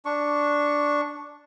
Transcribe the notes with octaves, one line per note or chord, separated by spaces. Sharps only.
D4 C#6